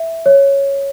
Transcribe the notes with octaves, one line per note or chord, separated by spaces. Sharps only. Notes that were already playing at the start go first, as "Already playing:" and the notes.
Already playing: E5
C#5